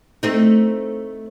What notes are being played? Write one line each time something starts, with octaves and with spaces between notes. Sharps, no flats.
A3 C4 D#4